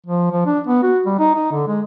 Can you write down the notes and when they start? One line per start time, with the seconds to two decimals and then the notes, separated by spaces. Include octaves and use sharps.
0.06 F3
0.32 F3
0.46 D4
0.67 B3
0.83 F#4
1.06 G3
1.19 D#4
1.35 D#4
1.52 D3
1.67 G#3